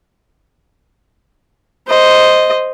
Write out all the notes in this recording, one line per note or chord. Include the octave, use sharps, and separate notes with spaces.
C5 D#5